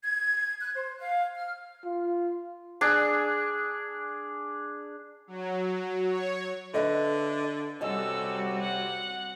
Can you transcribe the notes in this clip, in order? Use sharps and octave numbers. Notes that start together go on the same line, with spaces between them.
G#6
F#6
C5
F5
F6
F4
D4 G#4
F#3
C#5
D3 B4 D#5 E5
F#2 C3 G3 F#4 A4 D#5 G#5 E6
F#5